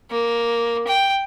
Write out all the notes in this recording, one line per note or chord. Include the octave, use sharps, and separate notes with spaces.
A#3
G5